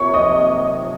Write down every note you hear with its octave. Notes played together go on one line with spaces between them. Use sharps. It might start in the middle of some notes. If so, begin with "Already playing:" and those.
Already playing: C3 F3 A#3 C#5 C#6
D#5 D#6